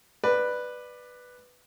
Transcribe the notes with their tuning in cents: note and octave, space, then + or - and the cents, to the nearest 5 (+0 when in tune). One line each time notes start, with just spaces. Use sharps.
B4 +0 D5 +20